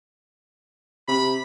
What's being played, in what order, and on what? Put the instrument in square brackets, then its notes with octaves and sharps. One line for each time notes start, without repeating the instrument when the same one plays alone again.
[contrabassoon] C3 [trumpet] B5